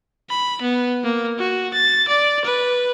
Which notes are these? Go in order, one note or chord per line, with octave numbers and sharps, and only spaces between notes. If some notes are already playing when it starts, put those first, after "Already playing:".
B5
B3
A#3
F#4
A6
D5
B4